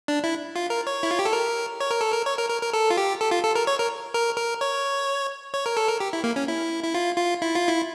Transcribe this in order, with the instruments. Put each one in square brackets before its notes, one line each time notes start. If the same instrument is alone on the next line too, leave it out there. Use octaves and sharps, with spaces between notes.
[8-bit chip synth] D4
E4
F4
A#4
C#5
E4
F4
G4
A4
A#4
C#5
A#4
A4
A#4
C#5
A#4
A#4
A#4
A4
F4
G4
A4
F4
A4
A#4
C#5
A#4
A#4
A#4
C#5
C#5
A#4
A4
A#4
G4
E4
A#3
C#4
E4
E4
F4
F4
E4
F4
E4